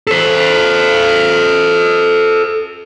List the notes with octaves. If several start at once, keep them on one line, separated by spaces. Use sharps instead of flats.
A4 C5